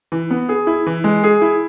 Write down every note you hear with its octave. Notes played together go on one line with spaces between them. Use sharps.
E3
B3
G#4
E4
E3
G#3
G#4
E4